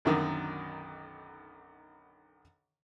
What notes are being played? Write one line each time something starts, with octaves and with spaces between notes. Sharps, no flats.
B1 F#2 D3 D#3 A#4 F#5